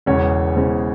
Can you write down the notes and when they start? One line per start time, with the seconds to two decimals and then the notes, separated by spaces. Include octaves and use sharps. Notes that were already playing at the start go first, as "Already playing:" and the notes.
0.06 E1 E2 C#3 C#5
0.55 E1 E2 C#3 C5